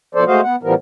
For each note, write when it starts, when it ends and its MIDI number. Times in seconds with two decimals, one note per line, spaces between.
0.15 0.24 47
0.15 0.24 53
0.15 0.24 69
0.15 0.24 72
0.15 0.24 74
0.27 0.41 56
0.27 0.41 57
0.27 0.41 66
0.27 0.41 72
0.27 0.41 75
0.27 0.41 77
0.43 0.56 59
0.43 0.56 78
0.63 0.74 45
0.63 0.74 52
0.63 0.74 53
0.63 0.74 55
0.63 0.74 59
0.63 0.74 70